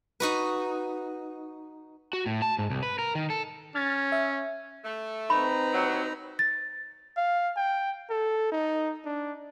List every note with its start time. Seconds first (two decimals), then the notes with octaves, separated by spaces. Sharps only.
0.20 D#4 F#4 B4
2.13 F#4
2.26 A2
2.42 A5
2.59 G#2
2.70 C2
2.83 B4
2.99 A#4
3.15 D#3
3.30 A4
3.75 C#4 F6 G#6 A6
4.12 E5
4.84 A3
5.30 C4 D#4 B4 A#5 B5
5.72 D#2 E3 F#3
6.39 A6
7.17 F5
7.56 G5
8.10 A4
8.52 D#4
9.05 D4